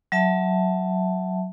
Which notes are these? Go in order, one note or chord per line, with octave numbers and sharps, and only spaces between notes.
F#3 E5 A5